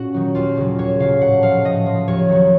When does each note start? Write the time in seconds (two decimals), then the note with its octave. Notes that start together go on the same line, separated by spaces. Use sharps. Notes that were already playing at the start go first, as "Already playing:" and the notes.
Already playing: A#2 C#4 F#4
0.14 D#3 F#3
0.35 D#2 F4
0.57 C#3 F#3
0.78 D#2 C#5
1.00 C#3 F#3 F5
1.21 A2 F#5
1.42 F3 F5
1.65 A2 D#5
1.86 F3
2.08 D#2 C#5
2.29 D#3 F#3